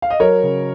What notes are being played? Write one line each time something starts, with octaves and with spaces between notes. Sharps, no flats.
F5
D#5
F#3 A#4 C#5
C#3